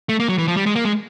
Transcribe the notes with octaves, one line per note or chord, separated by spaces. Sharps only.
A3
A#3
F#3
E3
F3
G3
G#3
A#3
G#3